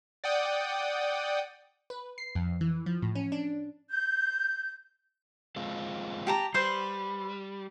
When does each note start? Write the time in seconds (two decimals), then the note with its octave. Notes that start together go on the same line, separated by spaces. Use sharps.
0.24 D5 F#5 G5 D#6
1.90 B4
2.18 C7
2.35 F2
2.61 E3
2.86 F3
3.02 A2
3.15 C#4
3.32 D4
3.91 G6
5.56 G#3 C4 F4
6.27 G4 A5 A#5
6.54 G3 B4 C5 C6